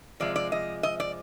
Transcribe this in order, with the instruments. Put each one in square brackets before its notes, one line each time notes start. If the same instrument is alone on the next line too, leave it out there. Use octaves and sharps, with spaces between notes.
[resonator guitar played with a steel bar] C3 F3 G#3 D5
D5
D#5
D#5
D5